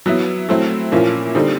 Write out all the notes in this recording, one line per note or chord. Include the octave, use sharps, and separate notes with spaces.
F#3 B3 E4
F#3 A3 C4 E4
A#2 F3 A#3 C#4 E4
D3 G3 C4 D#4